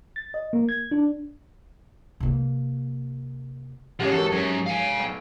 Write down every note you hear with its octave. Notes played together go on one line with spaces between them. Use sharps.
A6
D#5
A#3
G#6
D4
C3 A#3
A1 C#3 F3 G#3 G4 C#5 F#5
E2 G#2 F#4 G4 A4 A#4
F#2 G#4 C#5
G#2
F5 G#5
B1